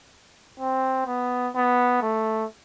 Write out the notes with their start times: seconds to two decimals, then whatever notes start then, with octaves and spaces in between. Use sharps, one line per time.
0.60 C4
1.07 B3
1.55 B3
2.02 A3